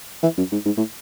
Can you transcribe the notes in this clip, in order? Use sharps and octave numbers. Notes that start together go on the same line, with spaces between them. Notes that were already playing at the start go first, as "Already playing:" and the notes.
E3
F#2
G#2
G#2
A2